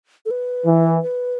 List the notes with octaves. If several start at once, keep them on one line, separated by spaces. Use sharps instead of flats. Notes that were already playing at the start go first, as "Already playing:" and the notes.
A4
B4
E3
B4